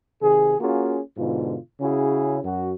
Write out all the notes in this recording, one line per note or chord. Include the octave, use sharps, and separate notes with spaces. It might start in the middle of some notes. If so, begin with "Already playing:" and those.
C3 D#3 G#4
A#3 C#4 F4 F#4 G#4
G#2 B2 D3 F4
C#3 C#4 E4 F#4 G#4
F#2 F#4